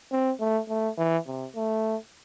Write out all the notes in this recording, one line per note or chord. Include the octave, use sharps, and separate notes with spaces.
C4
A3
A3
E3
C3
A3